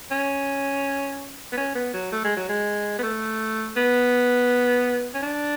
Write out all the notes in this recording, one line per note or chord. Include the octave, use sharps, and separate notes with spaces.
C#4
B3
C#4
B3
F#3
A3
G#3
F#3
G#3
B3
A3
B3
C#4
D4